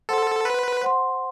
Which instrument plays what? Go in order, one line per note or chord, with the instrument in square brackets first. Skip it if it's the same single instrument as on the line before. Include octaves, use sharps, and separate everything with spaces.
[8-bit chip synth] A4 [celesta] C5 F#5 C6
[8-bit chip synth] B4
[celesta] C5 F#5 C6